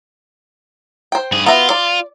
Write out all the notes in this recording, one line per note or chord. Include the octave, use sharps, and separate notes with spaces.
C5 G5
G2 G#4
B3 F4 F#4 E5
D5